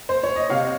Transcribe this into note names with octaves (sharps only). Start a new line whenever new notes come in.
C5
C#5
D#5
C3 C#5 F5